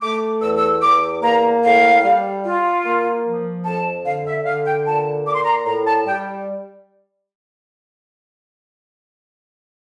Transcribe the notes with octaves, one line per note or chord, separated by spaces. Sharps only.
A3 D6
E2 E6
E6
E2 D6
A#3 A#5
A2 F5
G3
F4
A#3
F3
F2 A5
D3 F5
E5
D3 F5
G5
A#2 A5
A#2 D6
C6
A#5
C6
A2 A#5
A5
G3 G5